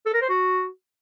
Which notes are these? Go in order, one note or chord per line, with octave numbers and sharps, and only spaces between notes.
A4
A#4
C5
F#4